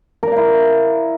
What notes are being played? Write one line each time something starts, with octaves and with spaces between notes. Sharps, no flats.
E4 A#4 D5 F5